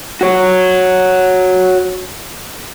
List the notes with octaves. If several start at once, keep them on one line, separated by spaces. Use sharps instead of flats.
F#4 C#5